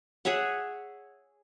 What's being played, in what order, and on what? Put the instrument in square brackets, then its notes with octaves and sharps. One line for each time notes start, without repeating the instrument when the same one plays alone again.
[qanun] G#4 C#5 E5 F#5